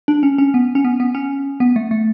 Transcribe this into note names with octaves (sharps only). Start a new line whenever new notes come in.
D4
C#4
C#4
B3
C#4
B3
B3
C#4
B3
A3
A3